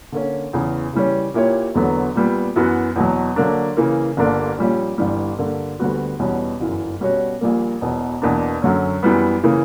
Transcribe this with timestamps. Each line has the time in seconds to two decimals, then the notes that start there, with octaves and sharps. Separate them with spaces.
0.12 D3 A#3 C#4
0.53 E2 C#3 E3
0.93 C#3 E3 G3 C#4
1.34 A#2 A#3 E4 G4 C#5
1.75 E1 E2 D3 F#3 B3
2.15 A#2 G3 B3
2.56 F#2 E3 B3 F#4
2.96 E2 B2 F#3
3.36 D3 F#3 A#3 D4
3.77 C#3 E3 A#3
4.17 G1 G2 D3 A#3 D4
4.58 A#1 A#2 G3 C#4
4.98 G1 G2 E3 G3
5.39 G2 D3 A#3
5.79 D2 D3 G3 B3 F#4
6.19 E2 B2 G3 C#4 F#4
6.60 G1 F#2 E3
7.01 B2 G3 C#4 F#4 C#5
7.41 A#1 A#2 G3 A#3
7.81 E1 E2 B2
8.22 E2 B2 A#3 D4
8.62 F#2 D3 F#3 C#4
9.03 F#2 E3 G3 B3
9.43 C#3 E3 A#3